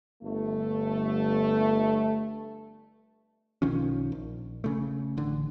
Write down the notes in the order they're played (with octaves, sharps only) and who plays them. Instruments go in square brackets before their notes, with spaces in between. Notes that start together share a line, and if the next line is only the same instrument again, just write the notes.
[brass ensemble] G1 A3
[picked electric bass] B1 D#3 F3 C#4
A#1
C#3 A3
A1 D3